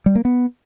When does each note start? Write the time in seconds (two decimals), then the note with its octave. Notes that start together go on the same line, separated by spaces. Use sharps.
0.06 G3
0.15 A#3
0.25 B3